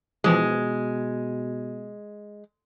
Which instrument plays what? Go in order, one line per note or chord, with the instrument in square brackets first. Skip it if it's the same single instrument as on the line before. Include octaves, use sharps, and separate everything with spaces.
[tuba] B2 [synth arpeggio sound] E3 F3 G4 [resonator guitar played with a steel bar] G#3